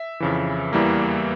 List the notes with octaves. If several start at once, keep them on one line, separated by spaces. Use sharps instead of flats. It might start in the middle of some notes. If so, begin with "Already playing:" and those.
Already playing: E5
F2 C#3 E3
E2 E3 G3 A#3